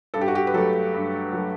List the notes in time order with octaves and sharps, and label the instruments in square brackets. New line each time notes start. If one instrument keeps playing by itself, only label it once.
[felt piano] G2 A4
G4
F#4
G4
B4
F#3 A3 A4
G2
F#3 A3